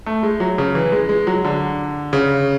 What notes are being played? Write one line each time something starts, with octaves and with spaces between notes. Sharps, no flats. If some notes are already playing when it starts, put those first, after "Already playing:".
A3
G#3
F#3
C#3
E3
G#3
G#3
F#3
D3
C#3